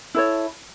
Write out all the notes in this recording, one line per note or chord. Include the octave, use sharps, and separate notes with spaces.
E4 A4 C#5